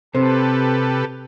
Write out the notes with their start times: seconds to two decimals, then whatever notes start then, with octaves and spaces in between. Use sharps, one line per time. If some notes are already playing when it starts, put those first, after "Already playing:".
0.15 C3 C4 G4 A4 B4